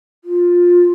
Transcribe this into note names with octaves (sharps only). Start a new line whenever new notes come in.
F4